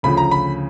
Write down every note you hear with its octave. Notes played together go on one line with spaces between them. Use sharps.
D2 C#3 F3 B5
A#5
B5